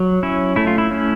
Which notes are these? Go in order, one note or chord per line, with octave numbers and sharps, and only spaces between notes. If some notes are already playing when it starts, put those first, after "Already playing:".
Already playing: F#3
C#4 E4
A3 E4
F4
E4
C#4